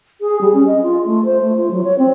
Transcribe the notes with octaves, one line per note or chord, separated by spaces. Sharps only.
G#4
G3
C#4
D#5
F4
A3
C5
A3
F4
F#3
C#5
C4